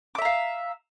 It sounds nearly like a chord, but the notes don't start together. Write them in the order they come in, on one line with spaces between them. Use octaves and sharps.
D6 E5 A#5 F5